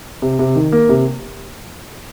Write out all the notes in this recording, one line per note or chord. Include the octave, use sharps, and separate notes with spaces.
C3
C3
D#3
A#3
C3